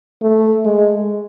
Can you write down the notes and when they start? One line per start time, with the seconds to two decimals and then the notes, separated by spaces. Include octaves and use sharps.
0.22 A3
0.65 G#3